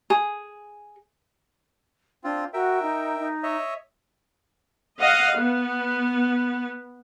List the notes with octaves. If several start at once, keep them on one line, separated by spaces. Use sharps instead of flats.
G#4
C4 D4 F4
F#4 A#4 E5 G5
D#4
D#4
C#5 D#5 E5
D#5 F5 F#5
B3